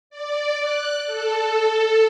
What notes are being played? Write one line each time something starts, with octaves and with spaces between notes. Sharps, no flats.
D5
F#6
A4